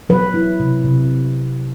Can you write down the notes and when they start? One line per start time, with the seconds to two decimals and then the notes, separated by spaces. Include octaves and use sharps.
0.09 F#3 B4
0.34 E4
0.60 C3
0.84 C3